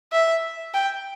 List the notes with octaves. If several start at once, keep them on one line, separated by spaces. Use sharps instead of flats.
E5
G5